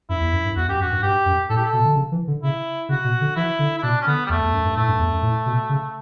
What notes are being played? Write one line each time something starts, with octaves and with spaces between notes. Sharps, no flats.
F#2 E4
E2
F#2
G2
E2 F#4
F#2 G4
F#2 F#4
G2
G2 G4
F#2
A2 A4
G4
A4
B2
D3
C#3
E3
D3
C#3 E4
C#3 F#4
B2
D3
E3 E4
D3
E4
B2 D4
C#4
D3 B3
G3
E2 A3
E2
F#2
G2
A2 A3
G2
E2
F#2
A2
B2
C#3